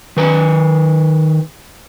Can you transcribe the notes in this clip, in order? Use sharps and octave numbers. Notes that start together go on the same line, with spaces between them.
D#3 B4 A#5